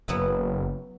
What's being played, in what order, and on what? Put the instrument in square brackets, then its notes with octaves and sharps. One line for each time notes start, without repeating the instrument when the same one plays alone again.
[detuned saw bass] F#1 [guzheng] F#3 B3 E4